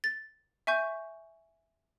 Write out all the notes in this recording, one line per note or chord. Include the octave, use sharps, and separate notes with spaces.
A6
E5 G#5 C#6 G6